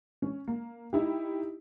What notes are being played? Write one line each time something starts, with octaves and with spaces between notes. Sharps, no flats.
C#4
A#3
D#4 E4 G4